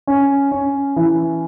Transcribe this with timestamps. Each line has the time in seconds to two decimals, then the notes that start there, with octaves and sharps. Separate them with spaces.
0.07 C#4
0.52 C#4
0.96 E3